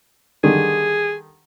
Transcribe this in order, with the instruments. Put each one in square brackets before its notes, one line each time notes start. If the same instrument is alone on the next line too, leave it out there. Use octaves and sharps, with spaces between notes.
[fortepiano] D3 D#3 G3 [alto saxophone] G#4